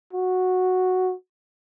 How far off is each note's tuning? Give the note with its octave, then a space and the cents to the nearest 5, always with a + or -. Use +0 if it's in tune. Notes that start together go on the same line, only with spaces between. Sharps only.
F#4 -5